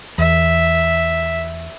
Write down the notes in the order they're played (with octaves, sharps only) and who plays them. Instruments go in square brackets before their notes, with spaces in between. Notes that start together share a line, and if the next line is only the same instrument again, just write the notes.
[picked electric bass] E2 [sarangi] E5